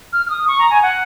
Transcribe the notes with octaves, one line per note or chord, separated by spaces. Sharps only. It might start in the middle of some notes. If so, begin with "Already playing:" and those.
F6
F6
D#6
C#6
A#5
G#5
F#5